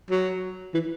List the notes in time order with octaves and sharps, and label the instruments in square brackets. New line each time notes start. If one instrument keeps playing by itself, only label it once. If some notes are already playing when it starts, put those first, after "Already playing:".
[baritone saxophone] F#3
E3